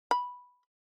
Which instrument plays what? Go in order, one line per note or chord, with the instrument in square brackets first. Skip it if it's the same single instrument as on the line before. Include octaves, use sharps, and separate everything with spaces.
[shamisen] B5